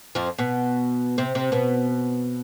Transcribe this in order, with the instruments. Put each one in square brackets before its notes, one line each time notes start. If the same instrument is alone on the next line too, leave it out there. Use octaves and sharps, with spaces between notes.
[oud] F2 F3
B2 B3
C3 C4
C3 C4
B2 B3